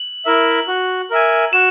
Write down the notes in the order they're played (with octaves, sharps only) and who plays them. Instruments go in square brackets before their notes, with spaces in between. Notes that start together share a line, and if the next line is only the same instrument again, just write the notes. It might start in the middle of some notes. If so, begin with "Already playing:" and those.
Already playing: [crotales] F#7
[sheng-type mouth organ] E4 A#4 E5
F#4
A#4 E5 G#5
[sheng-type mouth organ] F#4 [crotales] E7